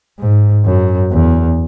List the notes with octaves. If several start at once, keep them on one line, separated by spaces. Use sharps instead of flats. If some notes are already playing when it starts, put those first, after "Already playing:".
G#2
F#2
E2